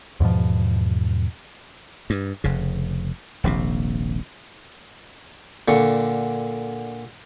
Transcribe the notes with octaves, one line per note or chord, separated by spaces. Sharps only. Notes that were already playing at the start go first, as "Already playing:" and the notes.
E2 G#2 B2 F3
G2
F1 C#3
D#1 A#1 C3
A#2 D3 C#6